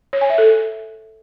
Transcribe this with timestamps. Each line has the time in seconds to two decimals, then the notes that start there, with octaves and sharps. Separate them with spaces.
0.13 C#5
0.21 G#5
0.30 E5
0.38 A4